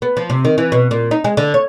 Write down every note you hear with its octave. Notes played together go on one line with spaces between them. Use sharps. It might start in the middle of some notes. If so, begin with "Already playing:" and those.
B3
F3
C3
D#3
E3
B2
A#2
D#4
G#3
D3
C#5